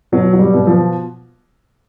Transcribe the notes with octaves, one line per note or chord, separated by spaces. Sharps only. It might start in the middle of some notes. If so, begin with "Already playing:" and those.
B2 F#3
F#3
G3
B2
F3